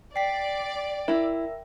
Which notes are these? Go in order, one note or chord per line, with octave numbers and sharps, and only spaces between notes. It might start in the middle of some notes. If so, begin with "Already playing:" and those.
D5 G5 B6 C7
E4 A#4 E5